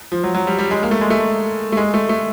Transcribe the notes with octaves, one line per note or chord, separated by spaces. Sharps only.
F3
F#3
F#3
G3
G3
G#3
A#3
A3
G#3
A3
A3
G#3
A3
A3